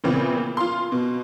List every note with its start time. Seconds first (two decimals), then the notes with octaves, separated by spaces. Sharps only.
0.04 A#2 C#3 E3 B3 C4
0.57 F4 C6
0.92 B2